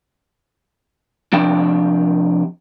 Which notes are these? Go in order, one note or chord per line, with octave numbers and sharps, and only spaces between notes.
C3 F3 D4 G4 G5